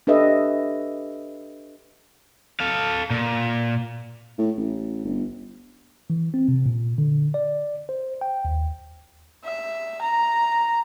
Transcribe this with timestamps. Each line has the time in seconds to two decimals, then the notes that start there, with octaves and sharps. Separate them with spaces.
0.07 D4 G4 A4 B4 D#5 E5
2.60 A4 F5
3.10 A#2
4.39 A2
4.58 A1
5.05 G1
6.10 E3
6.34 C4
6.48 C3
6.66 A#2
6.98 D3
7.34 D5
7.89 C5
8.21 G5
8.45 D#2
9.45 E5
10.02 A#5